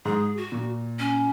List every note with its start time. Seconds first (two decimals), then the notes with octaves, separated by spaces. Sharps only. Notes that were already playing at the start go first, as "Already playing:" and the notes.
0.05 G#2 G#4
0.37 F#4
0.52 A#2
0.99 C#4